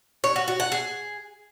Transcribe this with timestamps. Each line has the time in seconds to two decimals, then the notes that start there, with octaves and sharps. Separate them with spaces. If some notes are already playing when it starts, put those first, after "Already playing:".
0.24 C#5
0.36 F#4
0.48 F#4
0.60 F#5
0.72 G#4